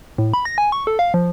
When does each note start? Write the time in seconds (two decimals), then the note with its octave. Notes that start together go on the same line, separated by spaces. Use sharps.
0.18 A2
0.34 B5
0.45 A#6
0.58 G#5
0.72 C#6
0.87 A4
0.99 F5
1.14 F3